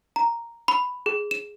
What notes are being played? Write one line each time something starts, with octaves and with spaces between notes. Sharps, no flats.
A#5
B5
G#4
E7